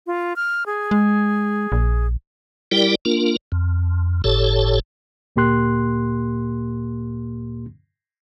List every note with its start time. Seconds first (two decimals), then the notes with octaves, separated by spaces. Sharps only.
0.07 F4
0.36 F6
0.66 G#4
0.91 G#3
1.72 A#1
2.71 G3 E4 G4 A#4 D5 G5
3.05 A#3 D4 F4 A#4
3.52 F2
4.24 G1 A2 G4 A4 C#5 A5
5.36 D2 A#2 A#3 G4 C6 F#6